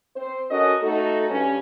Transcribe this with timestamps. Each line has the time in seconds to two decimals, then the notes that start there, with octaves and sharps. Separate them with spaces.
0.16 C4 C5
0.50 C#4 F#4 A4 A#4 D#5
0.82 A3 D#4 F#4 A4
1.30 G2 C#4